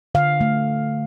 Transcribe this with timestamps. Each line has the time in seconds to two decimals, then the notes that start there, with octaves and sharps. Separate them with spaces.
0.15 D3 F5
0.41 A3